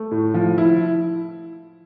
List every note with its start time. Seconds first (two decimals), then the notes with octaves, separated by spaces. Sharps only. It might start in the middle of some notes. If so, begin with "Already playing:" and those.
Already playing: A3
0.11 A2
0.34 F3
0.58 E4